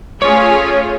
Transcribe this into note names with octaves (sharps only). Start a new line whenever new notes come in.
A3 C#4 F4 G#4 C#5